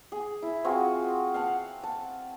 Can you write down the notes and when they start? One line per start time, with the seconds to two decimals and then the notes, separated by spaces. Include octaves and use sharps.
0.12 G#4
0.42 E4
0.64 C4 F4 F#4 G#4
1.34 F5 F#5 A5
1.83 A5